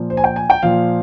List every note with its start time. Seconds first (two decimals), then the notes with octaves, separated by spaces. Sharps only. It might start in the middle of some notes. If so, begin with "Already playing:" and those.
Already playing: A#2 F3
0.10 C5
0.17 G#5
0.24 G5
0.36 G#5
0.50 G5
0.63 A#2 F3 F5